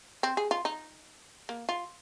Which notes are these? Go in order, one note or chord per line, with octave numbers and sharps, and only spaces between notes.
C4
G#4
F4
D#4
A#3
F4